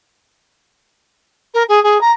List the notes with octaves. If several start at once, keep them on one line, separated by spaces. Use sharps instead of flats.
A#4
G#4
G#4
A#5